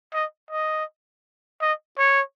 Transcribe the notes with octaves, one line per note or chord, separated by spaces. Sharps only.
D#5
D#5
D#5
C#5